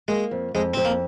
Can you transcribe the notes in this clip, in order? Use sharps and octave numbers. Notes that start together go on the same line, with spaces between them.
G#3 A#3
F2
F2 G#3
F2 C4
A#3